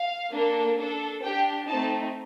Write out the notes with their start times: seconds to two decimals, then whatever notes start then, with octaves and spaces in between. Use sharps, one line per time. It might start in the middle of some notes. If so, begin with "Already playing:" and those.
Already playing: F5
0.32 A#3 D4 A4
0.78 D4 A4
1.23 D4 G4 G5
1.68 A3 C4 D#4 A5